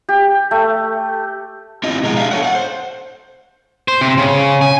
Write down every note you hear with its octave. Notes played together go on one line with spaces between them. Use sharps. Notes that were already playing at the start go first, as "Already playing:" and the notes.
G4
A3
C4 E4 F4 G4 D#5
B2 F3 G#3 G4 G#4 A#5
D4 E5 F5
A4 C#5 F#5
F5 F#5
C5
C5
C3
C#3
G#5